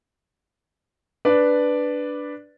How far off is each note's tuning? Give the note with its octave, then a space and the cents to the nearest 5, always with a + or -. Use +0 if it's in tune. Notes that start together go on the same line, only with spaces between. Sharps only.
D4 +0 B4 +0 D5 +0